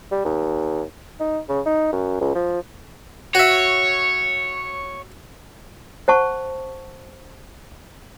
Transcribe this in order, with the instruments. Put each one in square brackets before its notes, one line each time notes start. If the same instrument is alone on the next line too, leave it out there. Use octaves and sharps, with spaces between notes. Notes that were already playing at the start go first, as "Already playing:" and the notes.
[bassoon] G3
D#2
D#4
C#3
D#4
F#2
C#2
F3
[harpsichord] F#4 E5 [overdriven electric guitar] C#5
[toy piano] C5 F#5 A5 C#6